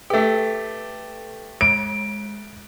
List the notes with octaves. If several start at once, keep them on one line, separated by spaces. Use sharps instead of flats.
A3 G4 A4 B4
G#3 D7